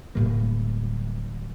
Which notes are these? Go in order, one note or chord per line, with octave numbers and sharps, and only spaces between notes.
D1 A2 G3 A#3